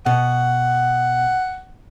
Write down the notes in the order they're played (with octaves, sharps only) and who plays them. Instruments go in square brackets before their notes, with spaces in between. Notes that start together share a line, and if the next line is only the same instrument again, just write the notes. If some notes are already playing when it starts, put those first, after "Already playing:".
[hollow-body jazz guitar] B2 [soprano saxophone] F#5